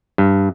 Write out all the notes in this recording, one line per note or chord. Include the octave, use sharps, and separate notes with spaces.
G2